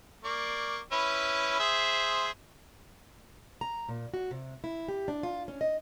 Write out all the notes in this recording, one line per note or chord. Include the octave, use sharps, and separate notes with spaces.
A#3 D5 C#6
C#4 E4 B4
G#4 C5 E5
A#5
A#2
F#4
C3
E4
G4
D4
F4
C#4
D#5